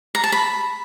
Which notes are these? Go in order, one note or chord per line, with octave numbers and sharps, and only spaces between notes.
A#5
A5
B5